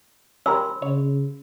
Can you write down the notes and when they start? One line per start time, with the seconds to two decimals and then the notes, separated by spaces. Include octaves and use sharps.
0.46 C#4 G4 A#4 B5 C6 E6
0.82 C#3 C#5